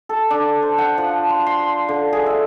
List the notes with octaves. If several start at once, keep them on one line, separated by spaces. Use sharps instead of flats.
A4
D4
C5
F#5
F3
C6
C6
D3
G#4
E5